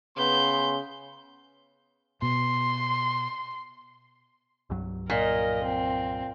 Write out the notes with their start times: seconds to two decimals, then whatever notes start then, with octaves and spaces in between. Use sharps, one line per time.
0.18 C#3 B3 C6 G6
2.22 B2 C6
4.70 C2 G2 F#3
5.10 A#2 A#4 D#5
5.64 C4